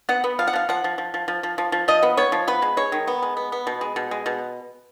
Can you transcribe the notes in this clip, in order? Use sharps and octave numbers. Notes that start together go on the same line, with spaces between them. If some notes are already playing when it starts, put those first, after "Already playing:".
B3 F#5
B3
F3 F5
F#5
F3 F5
F3 F#5
F3
F3
F3
F3
F3
F3
F3
F3 D#5
B3
B3 C#5
F3
B3 B4
G#3
G#3 C#5
D#3
B3
G#3
B3
B3
B2
G#3
B2
G#3
B2